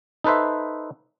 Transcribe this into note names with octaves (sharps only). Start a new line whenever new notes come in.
D#4 A4 B4 C5 E5